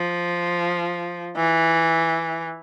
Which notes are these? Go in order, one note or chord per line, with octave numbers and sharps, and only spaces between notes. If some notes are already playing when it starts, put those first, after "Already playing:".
Already playing: F3
E3